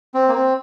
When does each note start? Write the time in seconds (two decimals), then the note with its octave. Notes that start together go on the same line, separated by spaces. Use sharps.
0.14 C4
0.28 A#3
0.35 C4